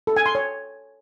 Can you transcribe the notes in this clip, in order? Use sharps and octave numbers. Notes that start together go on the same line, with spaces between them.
A4
G#5
C6
C#5